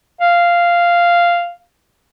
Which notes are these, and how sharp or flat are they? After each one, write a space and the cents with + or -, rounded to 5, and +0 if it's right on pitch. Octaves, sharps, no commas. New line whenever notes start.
F5 -5